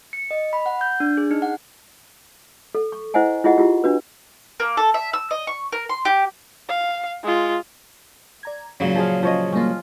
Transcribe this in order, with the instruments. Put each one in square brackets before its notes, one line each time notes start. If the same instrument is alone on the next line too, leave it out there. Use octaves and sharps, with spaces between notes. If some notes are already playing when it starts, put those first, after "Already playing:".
[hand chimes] C#7
D#5
B5
F#5
G6
D4
G#4
D#4
F#5
[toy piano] A4
C#6
E4 C5 D#5 F#5 G#5
E4 F4 G#4 D#5 F#5
E4 F4 G4
D4 F#4 B4
[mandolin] A#3
A4
E5
E6
D#5
C#6
A#4
C6
G4
[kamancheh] F5
G#3 F4
[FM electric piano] D5 A#5 G#6
[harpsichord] A#2 C#3 F#3 [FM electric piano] C#4
[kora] F3 G#4 F5
F3 C#5 D#5
[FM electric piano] G3 A#3 [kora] C#4 F4